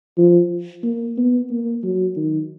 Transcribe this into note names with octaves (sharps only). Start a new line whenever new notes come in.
F3
A#3
B3
A#3
F#3
D#3